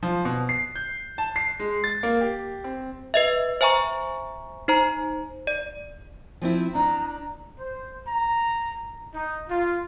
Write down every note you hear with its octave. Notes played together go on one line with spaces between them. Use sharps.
F3
B2
C7
G6
A5
C7
G#3
A6
A#3
G4
C4
B4 D#5 E5
C5 E5 G#5 A#5 C#6
D#4 C5 A#5
D5
F3 C4 E4
D4 A#5
C5
A#5
D#4
F4